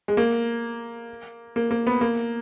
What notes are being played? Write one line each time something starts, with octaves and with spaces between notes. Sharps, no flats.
G#3
A#3
A#3
A#3
B3
A#3